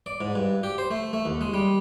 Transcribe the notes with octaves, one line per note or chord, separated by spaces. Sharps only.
D5
G#2
G2
G4
C5
A3
A3
D#2
G#3
G3